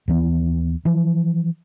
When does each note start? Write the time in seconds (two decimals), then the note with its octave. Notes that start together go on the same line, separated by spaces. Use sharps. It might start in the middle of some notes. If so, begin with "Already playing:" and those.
0.08 D#2 E3 B3
0.85 E3 F3